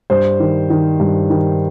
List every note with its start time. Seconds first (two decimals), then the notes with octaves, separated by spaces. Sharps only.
0.10 G2 C5
0.40 D#3
0.70 D#3
1.00 G2
1.30 D#3